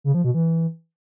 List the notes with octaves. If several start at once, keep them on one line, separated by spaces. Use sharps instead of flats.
C#3
F3
B2
E3